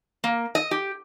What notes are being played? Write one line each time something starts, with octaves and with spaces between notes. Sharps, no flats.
A#3
D#5
G4